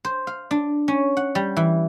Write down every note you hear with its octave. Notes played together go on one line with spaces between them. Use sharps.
C5
F5
D4
C#4
F#5
G3
E3